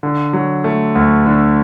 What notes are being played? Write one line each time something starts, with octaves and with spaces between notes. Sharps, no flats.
D3
F#3
A3
D2
D3